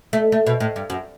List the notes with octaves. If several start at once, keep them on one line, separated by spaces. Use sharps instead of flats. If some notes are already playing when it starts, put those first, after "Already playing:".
A3
A3
B2
A2
G2
F#2